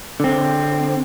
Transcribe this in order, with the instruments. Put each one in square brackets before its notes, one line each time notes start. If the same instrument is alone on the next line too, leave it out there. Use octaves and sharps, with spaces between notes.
[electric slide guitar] D3 C4